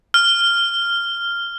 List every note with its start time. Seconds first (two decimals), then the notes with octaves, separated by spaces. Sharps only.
0.14 F6